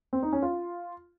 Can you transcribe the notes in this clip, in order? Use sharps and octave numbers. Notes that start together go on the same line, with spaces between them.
C4
D#4
C#4
F4